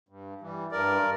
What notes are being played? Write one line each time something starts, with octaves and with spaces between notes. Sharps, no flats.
G2
E3 G3
G2 A#4 D5